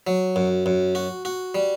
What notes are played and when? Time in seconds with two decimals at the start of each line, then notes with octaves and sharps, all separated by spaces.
0.07 F#3
0.36 F#2
0.66 F#2
0.95 F#4
1.25 F#4
1.55 G3